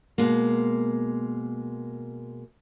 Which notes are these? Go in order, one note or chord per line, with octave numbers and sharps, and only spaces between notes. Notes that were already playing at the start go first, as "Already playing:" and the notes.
B2 G#3 A#3